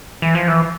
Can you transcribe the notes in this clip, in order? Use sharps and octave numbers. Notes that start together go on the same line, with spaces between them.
E3
F3
E3